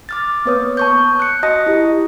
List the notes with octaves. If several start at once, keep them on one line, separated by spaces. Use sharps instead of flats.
D6 F6 A6
A#3 B3 B4 C#5 D#6
A5 C#6 G6
F#6 C#7
F#4 D#5 A5 D#6 A#6
E4 G4